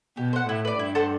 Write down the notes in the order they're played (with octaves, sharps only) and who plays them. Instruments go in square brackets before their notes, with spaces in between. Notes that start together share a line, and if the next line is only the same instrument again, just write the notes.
[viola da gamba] B2 [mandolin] G4
[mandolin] C5 F#5
[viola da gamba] A2 [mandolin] E4
[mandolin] B4 D5
[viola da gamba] G2 [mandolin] E4
[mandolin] A4 C5 F#5